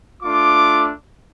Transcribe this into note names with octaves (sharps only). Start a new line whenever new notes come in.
A3 D4 F4 D6